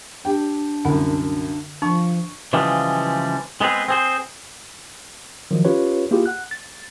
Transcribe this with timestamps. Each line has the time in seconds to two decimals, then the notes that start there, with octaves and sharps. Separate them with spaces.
0.25 D4 G4 G5
0.85 C2 F#2 D3 F#5
1.82 F3 D4 C#6
2.53 C#3 E3 F3 G3 G#3
3.61 G#3 B3 C4 G#4
3.88 C4 G#4 C5
5.51 D#3 F3 F#3
5.65 C#4 F4 G4 B4 C#5
6.11 A#3 E4 F4 G4 G#4
6.26 F#5 F#6
6.51 A6